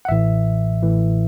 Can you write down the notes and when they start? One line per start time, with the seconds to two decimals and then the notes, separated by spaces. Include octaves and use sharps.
0.05 F#5
0.09 A1 A2 E3 E5
0.82 A1 A2 E3